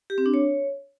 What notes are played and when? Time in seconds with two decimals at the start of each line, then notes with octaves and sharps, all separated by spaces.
0.10 G4
0.18 C4
0.26 D4
0.34 C#5